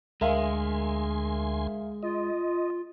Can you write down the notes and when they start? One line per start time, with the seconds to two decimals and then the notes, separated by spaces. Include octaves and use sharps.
0.21 D2 G#3 A#4 E5 F5 G#5 C6
2.03 F4 D#5